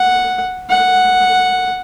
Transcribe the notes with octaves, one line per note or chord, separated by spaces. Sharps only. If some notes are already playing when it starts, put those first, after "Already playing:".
Already playing: F#5
F#5